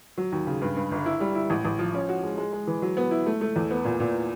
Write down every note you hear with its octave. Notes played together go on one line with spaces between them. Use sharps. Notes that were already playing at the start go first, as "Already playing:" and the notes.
F#3
D#2
C#3
G2
G2
G1
E4
G3
E4
A1
A1
F3
C#4
F#4
G#3
G#3
G#3
E3
F#3
B3
E4
A3
A3
E2
B3
A#2
A#2